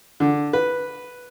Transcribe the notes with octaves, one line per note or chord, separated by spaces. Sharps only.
D3
B4